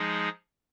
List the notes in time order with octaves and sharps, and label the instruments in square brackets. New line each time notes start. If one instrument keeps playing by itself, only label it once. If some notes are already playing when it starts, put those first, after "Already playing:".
Already playing: [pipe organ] F3 G#3 D#4 G#4